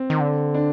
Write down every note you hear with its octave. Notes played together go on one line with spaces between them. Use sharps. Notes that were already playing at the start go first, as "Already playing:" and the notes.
Already playing: C4
D#3
D3
D4